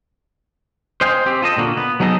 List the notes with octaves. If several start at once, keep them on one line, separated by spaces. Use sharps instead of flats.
C5 D#5 F5 G5 G#5
C4 G4
F4 A4 D#5
A#2 D3 A#3 F#4
B3
F#3 B3 D#4 G#4 A4 D#5